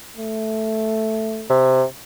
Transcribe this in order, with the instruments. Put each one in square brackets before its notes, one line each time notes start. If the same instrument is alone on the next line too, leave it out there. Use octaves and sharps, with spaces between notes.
[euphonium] A3
[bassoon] C3